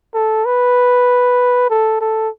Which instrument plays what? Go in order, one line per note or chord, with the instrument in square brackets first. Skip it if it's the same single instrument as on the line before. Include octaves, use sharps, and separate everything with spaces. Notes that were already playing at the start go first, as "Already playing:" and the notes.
[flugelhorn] A4
B4
A4
A4